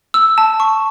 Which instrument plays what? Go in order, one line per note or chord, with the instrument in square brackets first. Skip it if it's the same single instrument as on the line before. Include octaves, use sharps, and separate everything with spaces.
[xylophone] E6
A5
C#6